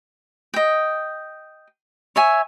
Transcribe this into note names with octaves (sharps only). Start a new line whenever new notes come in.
D#5 G5
C#5 E5 G#5